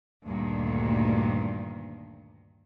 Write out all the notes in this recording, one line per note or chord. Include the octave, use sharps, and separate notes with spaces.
D2 G2 A#2 D#3